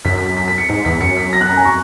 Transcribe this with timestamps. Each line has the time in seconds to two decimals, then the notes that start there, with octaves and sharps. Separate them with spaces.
0.05 F#2 B6
0.15 B6
0.26 B6
0.37 B6
0.48 B6
0.58 C#7
0.69 G#2 C#7
0.85 E2 B6
1.01 F#2 C#7
1.17 B6
1.33 A#6
1.41 F#6
1.49 A#5
1.57 G#5
1.65 C#6